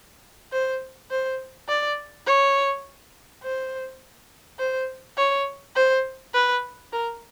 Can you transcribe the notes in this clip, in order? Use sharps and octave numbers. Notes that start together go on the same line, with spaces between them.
C5
C5
D5
C#5
C5
C5
C#5
C5
B4
A#4